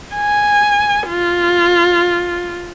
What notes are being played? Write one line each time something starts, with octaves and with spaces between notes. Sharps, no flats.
G#5
F4